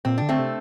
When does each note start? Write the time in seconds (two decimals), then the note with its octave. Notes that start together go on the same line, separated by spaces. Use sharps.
0.05 A#2 C4
0.18 D3 D4
0.29 A3 C4
0.39 C3